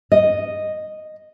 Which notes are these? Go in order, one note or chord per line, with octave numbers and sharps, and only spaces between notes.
D#5